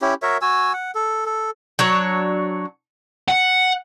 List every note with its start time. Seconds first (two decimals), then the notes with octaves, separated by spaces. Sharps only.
0.02 C#4 E4 G4
0.22 F#4 A#4 C#5 E5
0.42 F#4 G#5 E6
0.73 F#5
0.95 A4
1.26 A4
1.79 F#3 D4 C#5
3.28 F#5